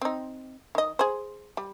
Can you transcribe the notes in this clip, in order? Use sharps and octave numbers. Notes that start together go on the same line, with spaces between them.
C4 D#4
D#3 D#5
G#4 C5
G3